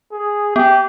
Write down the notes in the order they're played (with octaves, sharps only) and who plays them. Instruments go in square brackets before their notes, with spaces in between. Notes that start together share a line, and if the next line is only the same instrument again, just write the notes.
[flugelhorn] G#4
[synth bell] B3 [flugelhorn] G4